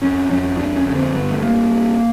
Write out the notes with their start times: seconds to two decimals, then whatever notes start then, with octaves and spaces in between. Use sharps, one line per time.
0.01 F2 C#4
0.29 F2 C#4
0.57 F2 D4
0.76 C#4
0.86 D3
0.95 C4
1.14 G2 B3
1.31 A3
1.42 G2 A#3
1.70 G2